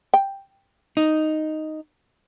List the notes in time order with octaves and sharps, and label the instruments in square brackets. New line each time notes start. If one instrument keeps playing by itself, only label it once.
[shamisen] G5
[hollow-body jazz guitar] D#4